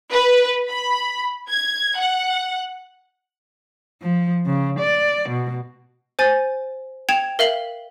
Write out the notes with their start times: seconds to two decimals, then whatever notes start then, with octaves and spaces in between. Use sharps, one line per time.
0.12 B4
0.68 B5
1.51 G#6
1.98 F#5
4.02 F3
4.46 C#3
4.79 D5
5.29 B2
6.19 C5 G#5 A6
7.09 G5 G#6 E7 F7
7.39 A#4 E5 F5 F#7